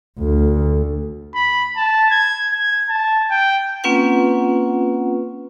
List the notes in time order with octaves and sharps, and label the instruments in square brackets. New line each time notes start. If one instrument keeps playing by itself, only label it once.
[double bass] D2
[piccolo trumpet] B5
A5
G#6
G#6
A5
G5
[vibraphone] A#3 C4 C#4 F4 B4 F#5